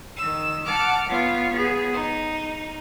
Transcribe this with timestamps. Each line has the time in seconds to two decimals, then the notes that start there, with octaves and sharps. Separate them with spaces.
0.17 D#3 E6
0.67 F#5 A5 D6 F6
1.09 B3 F4 C#5
1.53 B3 G#4
1.93 D#4